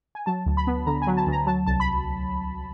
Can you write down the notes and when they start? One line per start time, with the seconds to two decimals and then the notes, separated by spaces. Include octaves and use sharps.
0.15 G#5
0.26 F#3 A5
0.46 D2
0.57 B5
0.67 B3
0.86 D3 A#5
1.02 G#5
1.07 F#3
1.17 A5
1.27 D2
1.32 A#5
1.46 F#3 A5
1.67 C2 A5
1.80 B5